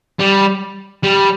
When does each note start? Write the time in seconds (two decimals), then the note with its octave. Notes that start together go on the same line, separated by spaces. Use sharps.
0.20 G3
1.03 G3